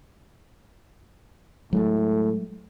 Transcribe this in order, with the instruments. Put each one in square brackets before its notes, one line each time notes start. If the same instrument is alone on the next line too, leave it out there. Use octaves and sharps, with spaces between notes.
[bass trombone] A2 [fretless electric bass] F#3 G#3 A3